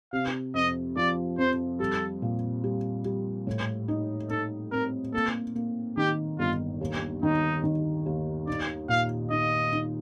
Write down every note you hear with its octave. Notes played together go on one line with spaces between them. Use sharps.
C3 F5
F2 D#5
F3 D5
F2 C5
G3 A4
A#2
G3
G3
A2
D#4
D#4 A4
C4 A#4
A#3 A4
A#3
D#3 G4
G1 F4
D#2
D#3 D#4
D#3
D#2
D#4 D5
A#2 F5
D#4 D#5
D#4